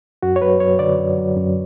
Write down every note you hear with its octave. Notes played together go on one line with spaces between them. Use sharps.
F#2 F#4
C#5
F#3 B4
F#2 C#5
D3 D5
F#2
F#3
F#2